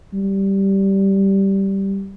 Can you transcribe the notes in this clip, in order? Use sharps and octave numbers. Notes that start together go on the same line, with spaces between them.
G3